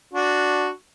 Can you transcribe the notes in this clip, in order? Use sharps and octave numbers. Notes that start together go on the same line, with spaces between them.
D4 F#4